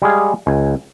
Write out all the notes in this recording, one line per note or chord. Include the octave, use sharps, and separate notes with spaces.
G3 G#3 G#4 F5
C#2 G#5